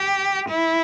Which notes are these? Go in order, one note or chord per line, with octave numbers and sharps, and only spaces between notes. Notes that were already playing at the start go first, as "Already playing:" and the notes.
Already playing: G4
E4